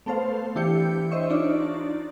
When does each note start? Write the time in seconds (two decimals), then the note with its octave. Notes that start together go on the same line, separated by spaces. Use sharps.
0.06 A3 B3 A4 C5 F5
0.55 E3 D4 E4 G4 G6 C#7
1.11 C5 C#5 D#5 E5 C#6
1.30 D4 D#4 F4 D5